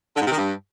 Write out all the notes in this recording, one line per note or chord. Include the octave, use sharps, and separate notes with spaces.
D3
G#2
C3
D#3
G2